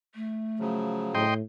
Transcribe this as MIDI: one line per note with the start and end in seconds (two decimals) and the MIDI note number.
0.15 1.09 57
0.59 1.26 49
0.59 1.26 53
0.59 1.26 54
1.15 1.41 45
1.15 1.34 75
1.15 1.34 79
1.15 1.34 84